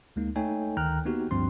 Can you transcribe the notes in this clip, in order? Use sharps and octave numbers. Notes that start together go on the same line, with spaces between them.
D2 G#3 A#3 D#4
A3 D#4 A4 C#5 G5 G#5
D2 D#3 G5 A#5 F6 F#6
A#3 B3 D#4 F#4 G4
D2 G2 F3 C4 C6